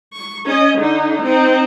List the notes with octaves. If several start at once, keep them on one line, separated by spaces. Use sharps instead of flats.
C#6
C#4 D#5
D3 D#4
C4 D#4